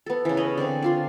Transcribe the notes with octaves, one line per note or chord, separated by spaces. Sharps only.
B3 A4
C#3 E3
B4 C#5 D#5
D3 C4
D4 F4 C6